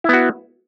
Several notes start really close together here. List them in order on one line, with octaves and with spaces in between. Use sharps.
E4 B3 F#4